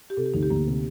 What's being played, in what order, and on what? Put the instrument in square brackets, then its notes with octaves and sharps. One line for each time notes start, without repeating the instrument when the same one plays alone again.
[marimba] G4
[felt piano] C3 [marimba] A4
[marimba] G4
[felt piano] D2 [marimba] D#4
[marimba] G4
[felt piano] D2 [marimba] A#3
[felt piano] C3